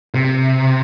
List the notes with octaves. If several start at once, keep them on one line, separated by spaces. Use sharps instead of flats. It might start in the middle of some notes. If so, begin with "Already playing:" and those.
C3